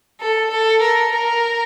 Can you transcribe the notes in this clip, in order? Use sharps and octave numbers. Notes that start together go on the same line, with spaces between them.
A4
A4
A#4
A#4